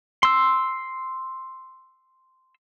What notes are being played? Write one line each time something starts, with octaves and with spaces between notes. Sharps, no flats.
C6 E6